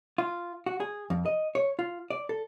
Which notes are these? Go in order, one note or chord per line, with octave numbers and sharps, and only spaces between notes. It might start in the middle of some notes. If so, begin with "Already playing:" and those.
F4
F#4
G#4
F2
D#5
C#5
F4
D5
A4